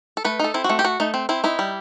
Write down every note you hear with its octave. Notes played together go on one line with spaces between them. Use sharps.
A4
A3 B4
D#4 A4
C4 E4
F#4
A3
G4
A3 F#4
A3 D#4
C4
C4 E4
D#4 E4
G3